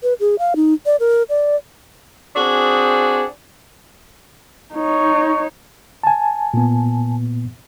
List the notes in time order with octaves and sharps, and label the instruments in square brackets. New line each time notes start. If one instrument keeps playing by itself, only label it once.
[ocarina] B4
G#4
F5
D#4
D5
A#4
D5
[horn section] C4 D4 F#4 G#4
[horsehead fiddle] D#4 C#5
[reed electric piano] G#5 A5
[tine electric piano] A#2 B3